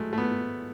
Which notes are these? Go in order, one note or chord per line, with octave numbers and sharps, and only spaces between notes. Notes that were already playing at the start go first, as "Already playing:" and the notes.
Already playing: F#3 G#3 A3
A3
B3